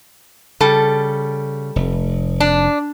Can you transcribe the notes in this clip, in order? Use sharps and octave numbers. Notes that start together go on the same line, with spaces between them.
C#3 G3 A4
F1
D4